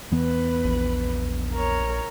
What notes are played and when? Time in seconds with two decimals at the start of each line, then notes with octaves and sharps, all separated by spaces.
0.11 E2 E3 B3 B4
0.65 A#1
1.53 A#4 C#5